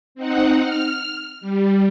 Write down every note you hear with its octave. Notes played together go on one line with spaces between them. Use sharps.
C4 D#4 F#5
F6
G3